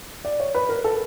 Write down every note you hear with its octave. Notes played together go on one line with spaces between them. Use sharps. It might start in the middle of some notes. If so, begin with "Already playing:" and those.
D5
C#5
B4
A#4
A4